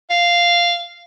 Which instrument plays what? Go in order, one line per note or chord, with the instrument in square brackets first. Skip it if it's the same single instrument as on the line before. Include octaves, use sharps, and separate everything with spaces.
[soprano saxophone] F5